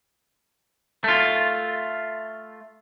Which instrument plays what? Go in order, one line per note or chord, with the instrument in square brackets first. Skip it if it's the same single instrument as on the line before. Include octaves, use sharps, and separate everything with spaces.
[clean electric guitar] A3 F4